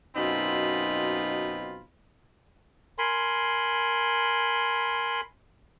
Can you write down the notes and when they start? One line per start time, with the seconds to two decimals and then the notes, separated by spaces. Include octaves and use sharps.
0.16 F#2 B2 C4 D#4 F4 B5
2.98 A#4 G#5 B5 C6